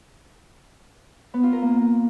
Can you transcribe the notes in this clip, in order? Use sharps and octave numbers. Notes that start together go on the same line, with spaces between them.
B3
F4
A#4
A#3